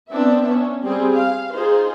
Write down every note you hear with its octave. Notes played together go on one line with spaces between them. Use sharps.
B3 C4 D4 E5
C#4
G3 C4 G#4
F5
D#4 F4 G#4 C5